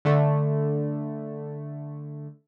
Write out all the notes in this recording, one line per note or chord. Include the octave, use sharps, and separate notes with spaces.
D3 A3